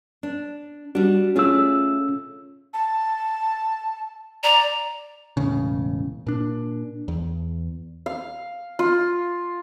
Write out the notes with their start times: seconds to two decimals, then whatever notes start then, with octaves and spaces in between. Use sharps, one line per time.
0.23 D4
0.95 G3 D4 F#4
1.36 A3 C#4 F4 G#4 E6
2.74 A5
4.43 D5 A#5
5.37 E1 A2 C#3
6.27 A#2 D4
7.08 E2
8.06 F5
8.79 F4